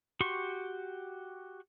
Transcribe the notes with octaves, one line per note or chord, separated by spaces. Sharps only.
F#4 G4 C6 C#6